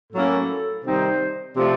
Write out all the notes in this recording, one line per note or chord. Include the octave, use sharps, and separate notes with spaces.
A2 F#3 A#3 C#4 E4 A4
C3 D#3 G3 C4 D#4 C5
C3 F3 A3 D5